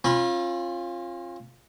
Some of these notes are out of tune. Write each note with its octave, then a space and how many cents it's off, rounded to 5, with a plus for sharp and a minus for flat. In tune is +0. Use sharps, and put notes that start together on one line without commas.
C#4 -45 F4 +0 B5 -10